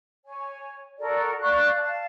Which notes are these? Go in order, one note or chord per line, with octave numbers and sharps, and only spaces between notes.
C#5 G#5
F#4 A4 A#4 D5
D5 F5 C#6 F#6
F5 A5